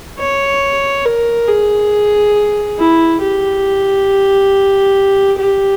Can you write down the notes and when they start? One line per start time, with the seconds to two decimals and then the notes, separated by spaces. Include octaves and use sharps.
0.19 C#5
1.05 A#4
1.48 G#4
2.79 E4
3.21 G4
5.39 G4